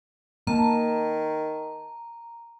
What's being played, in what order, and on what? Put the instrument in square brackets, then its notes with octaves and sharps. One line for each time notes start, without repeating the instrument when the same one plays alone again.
[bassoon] D#3 [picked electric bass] A#3 [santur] A5 [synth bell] A#5